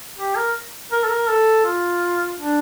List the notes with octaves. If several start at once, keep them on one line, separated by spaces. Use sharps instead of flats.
G4
A#4
A#4
A4
A#4
A4
F4
D4